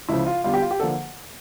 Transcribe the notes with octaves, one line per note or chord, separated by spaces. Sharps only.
C#2 C#3 F3 E4
F4
E2 D3 G3 F4
G4
F4
G4
D3 F3 A#3 A4